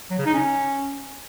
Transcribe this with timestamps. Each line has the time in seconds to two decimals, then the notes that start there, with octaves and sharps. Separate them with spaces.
0.10 F#3
0.18 C#3
0.26 D#4
0.34 C#4